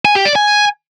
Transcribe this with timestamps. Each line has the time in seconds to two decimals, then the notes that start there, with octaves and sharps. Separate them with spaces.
0.05 G#5
0.15 G4
0.25 D5
0.35 G#5